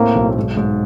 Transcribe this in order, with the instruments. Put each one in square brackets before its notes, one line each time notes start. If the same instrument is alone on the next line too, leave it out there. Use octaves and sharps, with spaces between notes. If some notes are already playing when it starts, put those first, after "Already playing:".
Already playing: [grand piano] A2 C4 [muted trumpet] A#3
[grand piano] B1
G#2
G#2